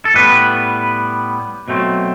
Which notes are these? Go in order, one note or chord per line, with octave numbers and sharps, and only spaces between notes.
A4
A2 G3 B3 B4
B2 F#3 A3 C4